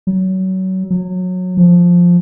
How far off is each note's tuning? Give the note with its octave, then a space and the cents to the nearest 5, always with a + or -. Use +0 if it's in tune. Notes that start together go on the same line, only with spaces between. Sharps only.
F#3 +25
F#3 -20
F3 +5